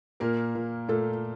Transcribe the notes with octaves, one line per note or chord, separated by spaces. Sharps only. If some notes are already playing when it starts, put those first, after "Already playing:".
A#2 A#3 A#4
A#2
A#2 A3 A4